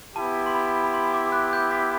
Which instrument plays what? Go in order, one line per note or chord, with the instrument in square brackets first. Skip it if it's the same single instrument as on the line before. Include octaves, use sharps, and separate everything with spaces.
[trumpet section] B3 E4 G4 [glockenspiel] A5
[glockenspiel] C6
B5
B5
C6
D6
F#6
G6
B6